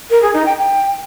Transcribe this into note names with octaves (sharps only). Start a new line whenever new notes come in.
A#4
G#4
D#4
G5
G5